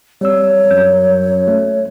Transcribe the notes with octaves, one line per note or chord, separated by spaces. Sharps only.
G3 C4 C#5 E6
F#2 G6
A3